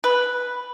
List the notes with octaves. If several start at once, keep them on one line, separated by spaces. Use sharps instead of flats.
B4